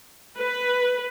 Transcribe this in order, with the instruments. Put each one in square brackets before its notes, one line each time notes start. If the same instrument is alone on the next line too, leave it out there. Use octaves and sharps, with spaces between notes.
[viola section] B4